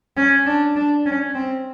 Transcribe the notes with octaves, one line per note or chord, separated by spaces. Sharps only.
C#4
D4
D4
C#4
C4